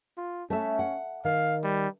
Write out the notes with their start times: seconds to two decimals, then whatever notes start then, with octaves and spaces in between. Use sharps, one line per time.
0.17 F4
0.50 A3 C#4 E5
0.79 F#5
1.25 D#3 F5
1.63 G3